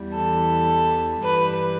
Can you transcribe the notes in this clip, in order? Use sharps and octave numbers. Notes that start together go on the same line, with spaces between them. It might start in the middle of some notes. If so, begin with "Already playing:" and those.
Already playing: E2 E3 G3
A4
G2 E3 G3 B4